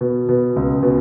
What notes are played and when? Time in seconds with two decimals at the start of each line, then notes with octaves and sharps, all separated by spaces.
0.01 B2
0.29 B2
0.56 C#2
0.83 B2